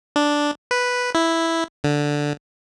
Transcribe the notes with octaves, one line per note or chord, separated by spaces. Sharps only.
D4
B4
E4
D3